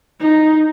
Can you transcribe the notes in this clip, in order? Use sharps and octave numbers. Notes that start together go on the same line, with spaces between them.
D#4